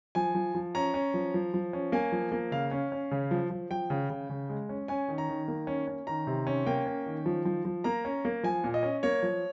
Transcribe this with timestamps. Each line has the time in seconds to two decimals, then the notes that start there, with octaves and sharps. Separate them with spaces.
0.15 F3 G#5
0.35 F3
0.55 F3
0.75 C#4 A#5
0.94 C#4
1.14 F3
1.34 F3
1.54 F3
1.73 C#4
1.92 A#3 G#5
2.12 F3
2.32 A#3
2.52 C#3 F5
2.71 C#4
2.92 C#4
3.11 C#3
3.31 F3
3.50 F3
3.71 F3 G5
3.90 C#3
4.10 C#3
4.29 C#3
4.49 G#3
4.69 C#4
4.88 C#4 G#5
5.08 D#3
5.18 A#5
5.29 D#3
5.48 A#3
5.67 C#4
5.88 C#4
6.07 D#3 A#5
6.27 C3
6.47 C#4
6.66 A#3 G5
6.86 C#4
7.06 D#3
7.26 F3
7.45 F3
7.65 F3
7.84 A#3 A#5
8.05 C#4
8.25 A#3
8.43 F3 G#5
8.64 A#2
8.74 D#5
8.83 C#4
9.03 A#3 C#5
9.23 F3